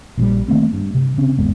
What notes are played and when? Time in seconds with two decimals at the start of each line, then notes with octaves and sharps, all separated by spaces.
0.18 A#1 A#2 E3 G3
0.48 D#3 A3 A#3 C4
0.73 G2
0.94 C3
1.18 C#3 C4 C#4
1.37 G#1 E2 G#3 B3